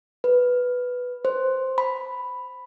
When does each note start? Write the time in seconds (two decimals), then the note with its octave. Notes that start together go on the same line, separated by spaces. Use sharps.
0.24 B4
1.25 C5
1.78 B5